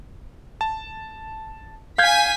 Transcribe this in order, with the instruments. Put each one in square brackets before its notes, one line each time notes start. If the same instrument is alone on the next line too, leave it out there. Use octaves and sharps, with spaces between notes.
[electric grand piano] A5
[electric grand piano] F5 G6 G#6 [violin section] G#5 B6